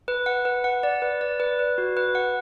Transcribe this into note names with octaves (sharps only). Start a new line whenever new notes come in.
B4
F#5
B4
F#5
D5
B4
D5
B4
B4
F#4
B4
F#5